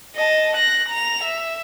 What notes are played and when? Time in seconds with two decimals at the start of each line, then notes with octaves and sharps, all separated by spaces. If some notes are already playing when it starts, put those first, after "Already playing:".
0.16 D#5 A5
0.55 F#6 A#6
0.89 A#5 F7
1.24 E5